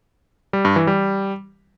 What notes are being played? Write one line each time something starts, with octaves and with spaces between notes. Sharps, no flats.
G3
G2
E3
G3